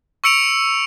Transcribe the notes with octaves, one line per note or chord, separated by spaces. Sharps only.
C#6 E6 C#7 D7 F7